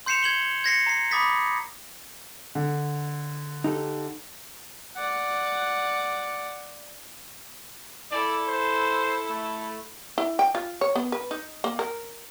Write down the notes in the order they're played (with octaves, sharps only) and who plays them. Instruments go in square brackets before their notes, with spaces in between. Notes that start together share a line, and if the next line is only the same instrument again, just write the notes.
[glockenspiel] C6 G6 C7 C#7 E7 F7
G#6 F#7 G7
G#6 A#6 C7 C#7
A#5 C7
B5 D6 D#6 A6 B6
[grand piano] D3
[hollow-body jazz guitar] D#4 G4 A4
[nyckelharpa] D5 F#5
[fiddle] E4 A4 [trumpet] D5
[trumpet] C5
A3
[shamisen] E4
G5
F4
C#5
B3
B4
D#4
A#3
A#4